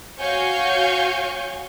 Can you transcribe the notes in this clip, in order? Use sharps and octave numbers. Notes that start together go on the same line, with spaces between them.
F#4 C#5 F5 G#5 C#6 G6